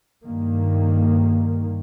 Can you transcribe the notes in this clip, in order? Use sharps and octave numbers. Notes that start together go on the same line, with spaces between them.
G2 D#3 A#3